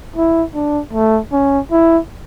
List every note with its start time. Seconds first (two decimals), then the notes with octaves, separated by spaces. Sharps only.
0.16 E4
0.54 D4
0.93 A3
1.32 C#4
1.71 E4